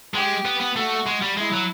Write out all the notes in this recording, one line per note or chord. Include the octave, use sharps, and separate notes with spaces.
G#3 G4
B3
B3
A3 F#4
G#3
G3
G#3 E4
F#3